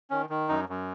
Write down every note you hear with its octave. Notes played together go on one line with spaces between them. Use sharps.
D#3 C#4
D#3
F#2 D#4
F#2